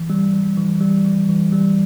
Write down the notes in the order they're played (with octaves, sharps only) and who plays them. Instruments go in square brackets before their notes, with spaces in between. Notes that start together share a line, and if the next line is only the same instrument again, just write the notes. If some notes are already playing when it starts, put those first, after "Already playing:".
Already playing: [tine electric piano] E3
G3
G3
E3
G3
E3
E3
G3